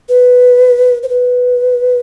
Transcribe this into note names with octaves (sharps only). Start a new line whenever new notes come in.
B4
C5
B4